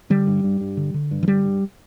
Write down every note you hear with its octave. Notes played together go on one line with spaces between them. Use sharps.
D3 G3
G2
G2
G2
D3
D3
G2
E3
D3 G3
G2